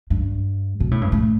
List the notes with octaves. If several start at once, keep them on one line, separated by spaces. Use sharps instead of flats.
G2
B2
A2
G2
A2